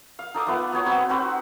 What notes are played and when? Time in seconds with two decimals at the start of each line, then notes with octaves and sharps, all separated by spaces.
0.19 F5
0.34 D#4 A4 D6 D#6
0.47 A3 B3 F4 B4
0.72 B3 F#4 C#5
0.85 C4 D#4 B4 F#5
1.09 C4 F#4 B4 C5